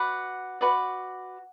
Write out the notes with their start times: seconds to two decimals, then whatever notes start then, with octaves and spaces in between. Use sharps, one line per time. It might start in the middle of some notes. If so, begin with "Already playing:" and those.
Already playing: F#4 B4 D5 F#5
0.61 F#4 B4 D5